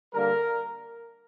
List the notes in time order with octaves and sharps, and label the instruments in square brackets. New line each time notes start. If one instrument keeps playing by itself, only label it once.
[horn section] D3 G3 A#3 A#4